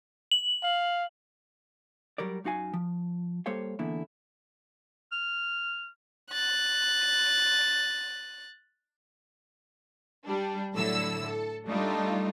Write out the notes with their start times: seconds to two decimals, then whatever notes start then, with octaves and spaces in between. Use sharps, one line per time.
0.31 F#7
0.63 F5
2.18 F#3 G3 A#4 D5
2.44 F#2 D#4 F#4 F5 G#5
2.74 F3
3.46 G3 A#3 A4 C5 C#5 F5
3.79 E2 D3 A#3 E4
5.12 F6
6.31 F#6 A6
10.27 G3 D4
10.75 A2 D3 F#3 E4 A4 E6
11.27 A4
11.66 G3 A3 D4 D#4 F4 A4